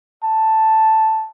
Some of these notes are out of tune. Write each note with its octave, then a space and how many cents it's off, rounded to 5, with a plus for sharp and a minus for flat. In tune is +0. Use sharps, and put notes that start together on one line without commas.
A5 +0